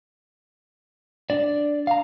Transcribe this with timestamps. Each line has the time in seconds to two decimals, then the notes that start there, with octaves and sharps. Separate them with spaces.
1.30 D4 D5
1.87 F5 A#5